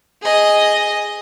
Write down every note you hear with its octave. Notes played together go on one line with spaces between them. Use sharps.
G#4 D#5